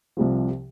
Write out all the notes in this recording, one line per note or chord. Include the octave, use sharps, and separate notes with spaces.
C2 C3 F3